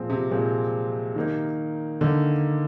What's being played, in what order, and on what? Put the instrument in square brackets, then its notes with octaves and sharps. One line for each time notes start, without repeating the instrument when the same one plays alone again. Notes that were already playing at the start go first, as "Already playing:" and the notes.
Already playing: [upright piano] A#2 F3 G#3 C4
[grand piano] C3
[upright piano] A#2 F3 G#3 C4
D#3 A#3 D#4
[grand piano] D3 [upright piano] D#3 A#3 D#4